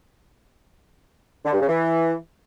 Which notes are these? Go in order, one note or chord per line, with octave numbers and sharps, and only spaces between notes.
D3
G2
C#3
E3